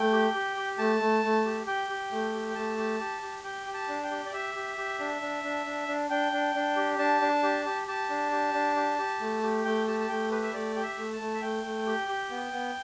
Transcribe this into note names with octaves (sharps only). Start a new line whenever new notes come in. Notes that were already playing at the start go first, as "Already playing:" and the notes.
Already playing: A3 G5
G4
G4
G4
A3 A5
A3
A3
G4
G4 G5
G4
A3
G4
G5
A3 A5
G4
G4
G4
G4 G5
G4
A5
D4
G5
G4
D5
G4 E5
G4
G4
D4
D4
D4
D4
D4
D4 G5
D4
D4
G4
D4 A5
D4
G4
G4
G4 A5
D4
G4
D4
G4
G4
A3
G4
A3 G5
G4 A5
A5
A3 G5
G4 B4
E5
A3 D5
G4 G5
E5
A3
A5
A3
E5
A3 G5
A3
G4
G4
B3
B3